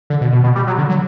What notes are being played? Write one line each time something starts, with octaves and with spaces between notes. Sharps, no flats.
D3
B2
B2
B2
G3
F#3
D3
F#3